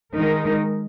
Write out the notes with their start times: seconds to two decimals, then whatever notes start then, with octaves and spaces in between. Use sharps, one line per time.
0.16 D#3 G#3 D#4 A#4